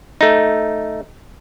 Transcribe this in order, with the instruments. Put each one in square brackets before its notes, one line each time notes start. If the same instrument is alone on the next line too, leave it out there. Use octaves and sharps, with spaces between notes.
[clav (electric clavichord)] A3 D#4